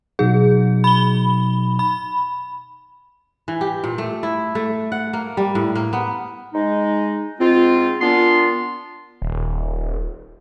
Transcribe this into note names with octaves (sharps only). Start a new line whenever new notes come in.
B2 F#3 D#4 G#4
B5 G7
B5
E3
G4
A#2
A3
E4
A3
F#5
A#3
G3
A2
A#3
B3
G#3 D#4
G#2 C4 F4
A#2 B3 D4 F4 C6
D#1